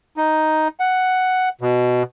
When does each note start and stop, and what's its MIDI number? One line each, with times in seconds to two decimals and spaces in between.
0.17 0.68 63
0.80 1.49 78
1.61 2.03 47